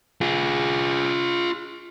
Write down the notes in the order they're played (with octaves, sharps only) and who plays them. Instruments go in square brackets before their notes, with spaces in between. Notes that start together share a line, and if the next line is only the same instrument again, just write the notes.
[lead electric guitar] F4 G#4